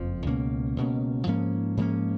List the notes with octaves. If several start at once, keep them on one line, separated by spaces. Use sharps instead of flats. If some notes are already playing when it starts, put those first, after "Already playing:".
Already playing: F#1 F2 F3
C#2 B2 A#3 C#4
C#2 B2 A#3 C#4
G#2 F3 A#3 C#4
G#2 F3 A#3 C#4